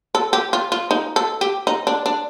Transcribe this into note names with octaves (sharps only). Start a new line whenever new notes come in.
A4
G4
F4
F4
D#4
A4
G4
D#4
D4
D4